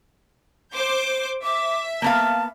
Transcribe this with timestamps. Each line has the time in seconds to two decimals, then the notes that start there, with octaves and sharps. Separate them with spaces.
0.74 C5 D6 G6
1.43 E5 D6
2.02 A#3 B3 F5 A5